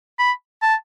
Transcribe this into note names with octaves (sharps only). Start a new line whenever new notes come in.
B5
A5